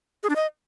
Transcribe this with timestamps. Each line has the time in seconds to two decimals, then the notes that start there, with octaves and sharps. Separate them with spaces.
0.23 G#4
0.29 D4
0.36 D#5